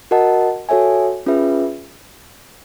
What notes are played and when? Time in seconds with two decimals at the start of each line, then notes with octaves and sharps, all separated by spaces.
0.11 F#4 A#4 D#5 F#5 A5
0.69 F#4 A4 C#5 E5 G#5
1.26 C#4 F4 G#4 B4 E5